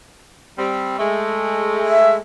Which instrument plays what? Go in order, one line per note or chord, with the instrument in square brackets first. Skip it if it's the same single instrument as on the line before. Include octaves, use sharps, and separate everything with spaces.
[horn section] G3 C4
G#3 A3
[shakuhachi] E5